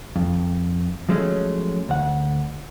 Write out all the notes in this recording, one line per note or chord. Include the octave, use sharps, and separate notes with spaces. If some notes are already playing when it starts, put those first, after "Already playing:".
F2
F3 F#3 G#3 A3 C#4
D2 F#5